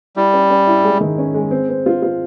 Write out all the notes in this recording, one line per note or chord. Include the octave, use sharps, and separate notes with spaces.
G3 E4
C#4
C#4
E4
G#3
D#3
C#4
G#3
C4
C4
F4
F4